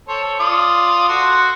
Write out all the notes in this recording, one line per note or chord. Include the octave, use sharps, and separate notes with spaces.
A4 C5 C#5
F4 D5 D#6
F#4 A4 C6